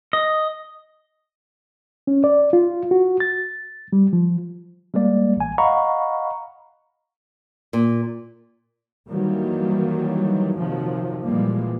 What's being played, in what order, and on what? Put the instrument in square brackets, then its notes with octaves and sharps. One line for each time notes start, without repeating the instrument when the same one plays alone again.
[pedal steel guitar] D#5
[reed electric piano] C#4
D5
F4
F#4
A6
G3
F3
[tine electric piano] G3 G#3 A#3 D5
A1 G#5
D#5 F5 F#5 A#5 B5 C#6
[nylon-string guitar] A#2
[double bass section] D#3 E3 F#3 G3 A#3
C3 D#3 F3 F#3
A#2 E3 F3 G3 G#3 A#3